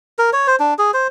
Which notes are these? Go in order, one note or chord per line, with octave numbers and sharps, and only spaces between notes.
A#4
C#5
C5
D4
G#4
C5